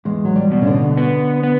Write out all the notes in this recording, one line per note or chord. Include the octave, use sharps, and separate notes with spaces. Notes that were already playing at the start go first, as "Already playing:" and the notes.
E2 G#3
F#3
G3
B2
C#3
D3
B3
B3